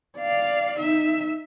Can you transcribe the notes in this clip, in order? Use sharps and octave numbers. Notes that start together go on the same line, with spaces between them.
D5 F5
D#4 E5